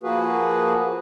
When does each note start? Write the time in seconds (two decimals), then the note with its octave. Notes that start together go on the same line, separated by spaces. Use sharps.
0.03 F3 A#3 F#4 G#4 B4